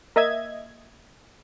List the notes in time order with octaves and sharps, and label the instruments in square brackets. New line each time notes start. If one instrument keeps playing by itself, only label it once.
[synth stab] A#3 D#5 E5 G#6